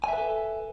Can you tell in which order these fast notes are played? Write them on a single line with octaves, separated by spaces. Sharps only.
G#5 E5 B4 A4